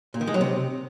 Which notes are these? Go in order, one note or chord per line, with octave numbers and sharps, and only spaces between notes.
A#2
D#3
G#3
F#3
C3